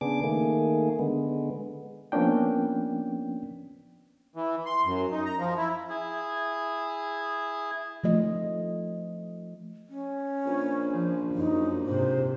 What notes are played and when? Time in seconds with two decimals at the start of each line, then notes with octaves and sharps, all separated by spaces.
0.01 C#3 B3 D4 G#4 D6
0.24 D#3 A3 A#3 G#4
0.99 D3 G#3 B3
2.12 F3 A#3 B3 C#4 D4 G5
4.36 E3
4.66 C6
4.85 F#2
5.12 D#4
5.26 A#5
5.38 F3
5.57 E4
5.90 E4 G#4
8.04 F3 A3 D#5
9.89 C#4
10.46 A#1
10.92 F3
11.34 F#2 D#4
11.86 G#2 C3 C5